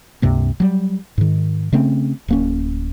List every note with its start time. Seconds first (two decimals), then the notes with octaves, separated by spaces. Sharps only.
0.22 C#2 G2 C3 A#3
0.60 F#3 G3
1.18 G#2 D#3
1.73 C#3 A3 C4 C#4
2.28 D1 A#3 C#4